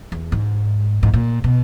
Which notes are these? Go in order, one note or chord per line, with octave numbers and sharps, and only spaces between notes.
E2
G#2
G#2
A#2
B2